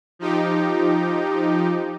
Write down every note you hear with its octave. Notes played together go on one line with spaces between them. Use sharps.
F3 D#4 G4